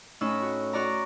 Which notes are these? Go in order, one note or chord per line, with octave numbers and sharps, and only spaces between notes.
A2 C#4 D#4 E4 E6
F#4
F#4 D5 A#5